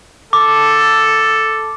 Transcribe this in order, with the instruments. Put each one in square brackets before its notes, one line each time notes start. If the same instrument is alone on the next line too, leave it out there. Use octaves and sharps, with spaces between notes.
[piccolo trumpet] A4 [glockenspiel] D6